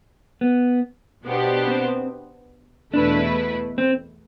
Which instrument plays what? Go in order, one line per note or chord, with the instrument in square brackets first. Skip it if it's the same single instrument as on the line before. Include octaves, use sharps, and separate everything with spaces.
[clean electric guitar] B3
[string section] B2 B3 D4 G4 C5
[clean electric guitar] C4
[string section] E2 B2 A3 E4 B4 [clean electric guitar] D4
[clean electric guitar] C4